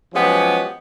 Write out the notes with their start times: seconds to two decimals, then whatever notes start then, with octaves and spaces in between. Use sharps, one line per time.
0.13 F3 F#3 G#3 B3 C#4 G4